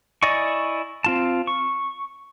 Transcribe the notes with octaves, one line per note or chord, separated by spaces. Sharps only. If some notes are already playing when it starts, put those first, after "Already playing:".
E4 D5 D#5 G#5 C#6
C4 F4 A5
C#6